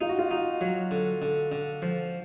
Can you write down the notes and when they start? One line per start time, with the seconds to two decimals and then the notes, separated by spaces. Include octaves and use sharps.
0.01 D#4 F4
0.09 F#4
0.19 F4
0.31 D#4
0.61 F#3
0.91 D3
1.22 D3
1.52 D3
1.82 F3